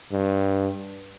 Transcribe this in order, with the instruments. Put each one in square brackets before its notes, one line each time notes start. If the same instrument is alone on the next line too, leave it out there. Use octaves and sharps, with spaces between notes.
[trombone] G2